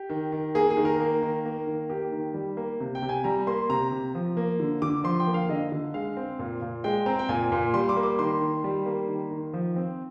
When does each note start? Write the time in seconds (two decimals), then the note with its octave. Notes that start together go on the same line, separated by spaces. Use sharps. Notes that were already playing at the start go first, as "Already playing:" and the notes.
Already playing: G4
0.10 D#3
0.32 D#3
0.55 A#3 G#4
0.70 G#4
0.77 D#3
0.85 A#4
1.00 A#3
1.22 D#3
1.45 A#3
1.67 D#3
1.89 A#3 G4
2.12 D#3
2.34 G3
2.57 A#3
2.80 C3
2.95 G5
3.02 C3
3.09 G#5
3.24 G3 A#5
3.47 A#3 C6
3.69 C3 A#5
3.92 C3
4.15 F3
4.37 A#3
4.60 D3
4.82 D3 D6
5.04 F3 C6
5.20 G5
5.27 A#3
5.34 F5
5.49 D3 D#5
5.72 D3
5.94 G#3 F5
6.17 C4
6.39 A#2
6.62 A#2
6.84 G#3 G5
7.06 C4 A#5
7.19 G5
7.29 A#2 G#5
7.52 A#2
7.74 G3 C6
7.89 D6
7.96 A#3
8.03 D6
8.19 D#3 C6
8.41 D#3
8.64 G3
8.86 A#3
9.08 D#3
9.31 D#3
9.53 F3
9.76 C4